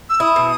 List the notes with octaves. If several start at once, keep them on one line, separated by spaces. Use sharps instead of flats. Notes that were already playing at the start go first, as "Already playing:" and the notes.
E6
E4 D#6
B2